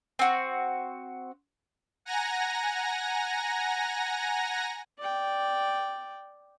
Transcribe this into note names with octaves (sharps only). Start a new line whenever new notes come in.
C4 F#4
F#5 G#5 A#5 A#6
D5 G5